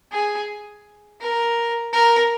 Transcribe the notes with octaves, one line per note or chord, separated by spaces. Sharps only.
G#4
A#4
A#4